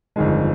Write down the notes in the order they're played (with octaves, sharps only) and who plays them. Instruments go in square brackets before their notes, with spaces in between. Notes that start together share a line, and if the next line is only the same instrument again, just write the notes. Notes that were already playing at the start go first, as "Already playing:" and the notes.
[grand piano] G1 F2 D#3 G#3